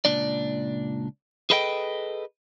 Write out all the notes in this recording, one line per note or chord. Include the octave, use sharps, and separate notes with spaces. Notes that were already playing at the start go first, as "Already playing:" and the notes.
C#2 A#2 D4 D5
G#4 A4 B4 D#5 F5 G5